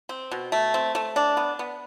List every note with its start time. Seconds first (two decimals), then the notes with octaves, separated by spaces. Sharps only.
0.09 C4
0.31 B2
0.52 A3
0.74 C4
0.95 A3
1.16 D4
1.37 B3
1.59 B3